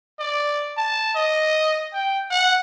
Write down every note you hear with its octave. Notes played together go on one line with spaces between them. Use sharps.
D5
A5
D#5
G5
F#5